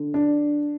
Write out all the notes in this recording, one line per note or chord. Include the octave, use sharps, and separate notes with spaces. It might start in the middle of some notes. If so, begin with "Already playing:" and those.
Already playing: D3
D4